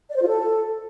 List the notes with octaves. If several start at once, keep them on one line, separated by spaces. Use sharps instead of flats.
D5
C5
F4
A4